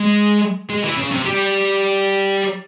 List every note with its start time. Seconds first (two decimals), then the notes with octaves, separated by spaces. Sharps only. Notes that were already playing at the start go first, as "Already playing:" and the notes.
Already playing: G#3
0.70 G#3
0.84 E3
0.98 C#3
1.11 C3
1.25 G3